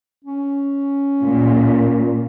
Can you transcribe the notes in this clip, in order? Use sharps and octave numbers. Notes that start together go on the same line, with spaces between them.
C#4
A#2